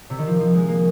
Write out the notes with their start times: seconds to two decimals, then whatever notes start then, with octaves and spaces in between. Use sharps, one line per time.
0.10 C3
0.18 D#3
0.27 F3
0.40 F3
0.54 G#3
0.68 A#3